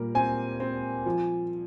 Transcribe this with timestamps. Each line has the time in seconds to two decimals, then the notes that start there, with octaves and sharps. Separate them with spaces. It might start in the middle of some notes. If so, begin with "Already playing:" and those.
Already playing: A#2 G3 A#4
0.15 C4 G#5
0.60 C4
1.06 F3